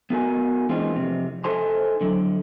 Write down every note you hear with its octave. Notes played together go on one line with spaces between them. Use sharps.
B3 D#4 F#4 A#4 G#5
E3 G#3 A#3 C4 D4 F4
F2 C3
D#4 A4 C5 G#5 A5 C6
D3 F#3